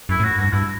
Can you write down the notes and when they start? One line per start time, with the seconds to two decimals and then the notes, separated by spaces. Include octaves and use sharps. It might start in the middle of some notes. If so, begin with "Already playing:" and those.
0.09 F#2 E4
0.20 A2
0.24 F#4
0.38 G2 F#4
0.53 G2 E4